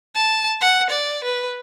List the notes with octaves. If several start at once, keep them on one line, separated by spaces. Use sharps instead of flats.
A5
F#5
D5
B4